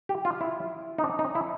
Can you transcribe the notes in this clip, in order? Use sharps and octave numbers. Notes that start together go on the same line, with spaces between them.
G4
F4
E4
D#4
D4
D#4
E4